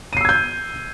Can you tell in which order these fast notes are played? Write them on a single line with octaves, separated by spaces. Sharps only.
D#7 C7 E6 G#6 G6